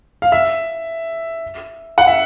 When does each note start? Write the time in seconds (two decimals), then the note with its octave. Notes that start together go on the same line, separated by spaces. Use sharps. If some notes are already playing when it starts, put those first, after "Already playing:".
0.22 F5
0.32 E5
1.98 F#5
2.07 E5